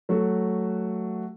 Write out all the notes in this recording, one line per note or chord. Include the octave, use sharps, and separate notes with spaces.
F#3 A3 F#4